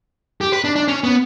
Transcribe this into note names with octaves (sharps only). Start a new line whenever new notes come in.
G4
B4
D4
D4
C#4
B3